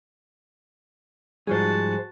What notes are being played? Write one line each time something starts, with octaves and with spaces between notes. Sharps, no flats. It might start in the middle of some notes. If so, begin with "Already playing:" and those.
G#2 F3 G3 F#4 G#4 C5 A5